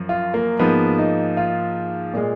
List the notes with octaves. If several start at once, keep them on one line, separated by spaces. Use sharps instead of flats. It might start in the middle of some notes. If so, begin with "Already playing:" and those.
Already playing: F#2 F3
F4
A#3
G#2 F3 A#3 B3
D#4
F4
A#2 G#3